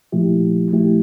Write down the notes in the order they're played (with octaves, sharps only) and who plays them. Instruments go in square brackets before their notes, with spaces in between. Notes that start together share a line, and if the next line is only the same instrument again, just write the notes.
[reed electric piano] A#2 F3 A3 E4 G4
A#2 F3 A3 E4 G4